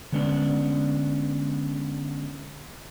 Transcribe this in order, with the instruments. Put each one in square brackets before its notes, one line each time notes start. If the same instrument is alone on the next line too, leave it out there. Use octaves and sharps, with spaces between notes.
[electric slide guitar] D3 G#3 B3 C#4 D4